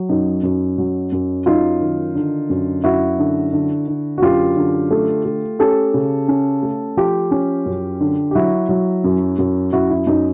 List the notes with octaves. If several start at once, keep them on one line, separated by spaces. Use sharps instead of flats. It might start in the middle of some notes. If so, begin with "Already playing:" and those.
Already playing: F#3
F#2 D#4
F#2
F#3
F#2
F#2 D#4 F4
D#3
D3
F#2
F#2 E4 F#4
D3
D3
D3
F#4
F#2 F4 G4
D3
A3
A3
C#4 G4 A4
C#3
C#4
A3
F3 F4 G4
C#4
F#2
D3
G4
F#3 E4 F#4
F#3
F#2
F#2
F#2 E4 F#4
E4
F#2 D#4